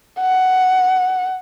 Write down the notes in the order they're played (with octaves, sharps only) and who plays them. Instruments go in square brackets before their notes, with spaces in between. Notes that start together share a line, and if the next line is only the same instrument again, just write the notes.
[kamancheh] F#5